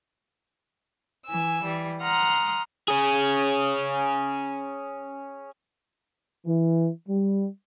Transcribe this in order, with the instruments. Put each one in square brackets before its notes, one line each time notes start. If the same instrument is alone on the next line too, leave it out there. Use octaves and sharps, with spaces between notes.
[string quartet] E3 G#5 E6
E3 G3
F#5 A#5 C6 D#6 F6
[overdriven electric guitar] C#4 G#4
[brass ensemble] E3
G3